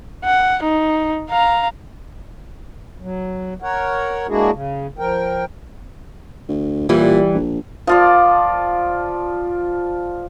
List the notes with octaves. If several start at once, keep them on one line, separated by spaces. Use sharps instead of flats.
F#5
D#4
F5 A#5
F#3
A#4 C#5 F#5
G#3 A#3 D4 E4 F#4 G#4
C#3
F3 A#4 G5
D2
A#2 E3 G3
A#1
F3 F4 D5